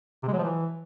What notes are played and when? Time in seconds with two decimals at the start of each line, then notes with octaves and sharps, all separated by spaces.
0.23 C3
0.28 G#3
0.33 F#3
0.38 F3
0.43 E3